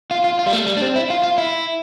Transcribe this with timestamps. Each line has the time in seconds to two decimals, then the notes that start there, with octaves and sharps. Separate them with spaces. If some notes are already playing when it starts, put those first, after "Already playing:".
0.11 F4
0.24 F4
0.39 F4
0.46 G3
0.53 A3
0.67 G3
0.77 D4
0.82 C4
0.96 E4
1.10 F4
1.23 F4
1.38 E4